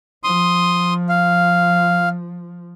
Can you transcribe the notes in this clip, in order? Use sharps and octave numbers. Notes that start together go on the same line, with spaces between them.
F3 C6 D#6
F5